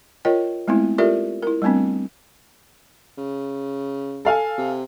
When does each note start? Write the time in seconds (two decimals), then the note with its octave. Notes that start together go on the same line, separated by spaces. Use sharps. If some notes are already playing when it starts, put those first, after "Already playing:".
0.25 F4 A#4 C#5 D#5 G5
0.68 G#3 A3 B3 C4 E4
0.98 F4 G4 A4 A#4 D5 E5
1.43 E4 A#4
1.62 G3 A3 B3 C4 D4
3.18 C#3
4.25 A4 F5 G#5
4.58 C3